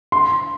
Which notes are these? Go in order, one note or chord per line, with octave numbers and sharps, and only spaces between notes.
C6